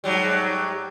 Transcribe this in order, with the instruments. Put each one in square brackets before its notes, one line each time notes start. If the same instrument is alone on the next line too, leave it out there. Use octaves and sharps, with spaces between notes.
[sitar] G#2 F#3 G3